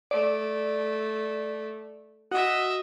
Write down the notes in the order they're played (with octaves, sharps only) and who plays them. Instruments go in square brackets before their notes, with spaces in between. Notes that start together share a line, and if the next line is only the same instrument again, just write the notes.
[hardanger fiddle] A3 [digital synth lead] D5
[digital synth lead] F#4 [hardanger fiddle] D#5 E5